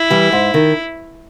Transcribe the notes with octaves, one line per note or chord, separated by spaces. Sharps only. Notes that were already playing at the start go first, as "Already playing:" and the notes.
Already playing: E4
E3 G3
G#2
D#3